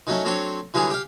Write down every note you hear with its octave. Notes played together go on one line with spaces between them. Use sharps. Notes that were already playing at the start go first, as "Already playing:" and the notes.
D#3 F#3 A3 C#4
F#3 A3 C4 D4 C#5
D3 E3 F#3 G3 G#4
G4 F5